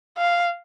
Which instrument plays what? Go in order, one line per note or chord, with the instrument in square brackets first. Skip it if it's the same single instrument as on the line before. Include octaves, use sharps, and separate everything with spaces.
[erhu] F5